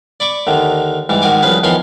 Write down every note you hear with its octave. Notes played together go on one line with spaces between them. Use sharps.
D5 B5 C#6 D6
D#2 D3 D#3
G#2 E3 G3
G#2 D#3 F#4 G#5 D6
C2 F3 C#4 G#4 B4
E2 D#3 F3 C#5 B5 C6